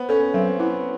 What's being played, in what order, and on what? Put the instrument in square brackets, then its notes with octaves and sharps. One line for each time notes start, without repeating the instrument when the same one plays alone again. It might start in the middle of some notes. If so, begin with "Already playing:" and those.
Already playing: [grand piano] B3 [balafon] C5
[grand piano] C#4 [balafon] A4
[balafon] F#3 [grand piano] C4
[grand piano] B3 [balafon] E4